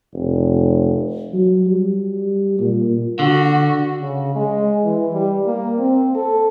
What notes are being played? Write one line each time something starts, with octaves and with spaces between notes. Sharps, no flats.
F1
F#3
G3
A#2
D3 F#4
C#3
G#3
E3
G3
A#3
C4
A4